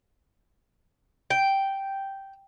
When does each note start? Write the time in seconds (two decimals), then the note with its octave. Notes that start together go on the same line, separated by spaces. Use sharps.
1.30 G5